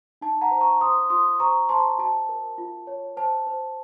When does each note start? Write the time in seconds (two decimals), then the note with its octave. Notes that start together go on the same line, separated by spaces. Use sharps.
0.21 D#4 A5
0.41 F#5 A#5
0.51 C5
0.61 A#5 C#6
0.81 C5 C6 D#6
1.10 F4 C6 D#6
1.40 C5 A#5 C#6
1.69 C5 A5 C6
1.99 F#4 A5
2.29 A#4
2.58 F4
2.87 C#5
3.17 C5 A5
3.47 C5